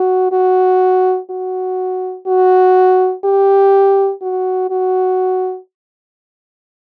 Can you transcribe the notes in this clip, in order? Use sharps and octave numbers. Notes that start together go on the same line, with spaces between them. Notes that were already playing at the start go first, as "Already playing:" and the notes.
Already playing: F#4
F#4
F#4
F#4
G4
F#4
F#4